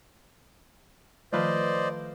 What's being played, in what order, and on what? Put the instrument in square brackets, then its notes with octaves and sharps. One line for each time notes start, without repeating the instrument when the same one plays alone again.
[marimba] D#3 F3 [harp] A3 F4 B4 [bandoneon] C5 D5 D#5